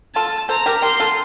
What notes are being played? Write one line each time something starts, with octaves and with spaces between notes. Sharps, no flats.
F4 A4 A5
A4 C5 A#5
G4 A#4
G4 A#4 C6
F4 A4